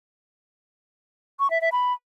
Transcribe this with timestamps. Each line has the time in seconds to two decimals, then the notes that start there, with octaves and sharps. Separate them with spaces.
1.40 C#6
1.50 E5
1.61 E5
1.72 B5